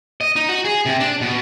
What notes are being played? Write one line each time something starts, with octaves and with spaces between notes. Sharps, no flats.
D#5
D#4
F#4
G#4
C3
D4
B2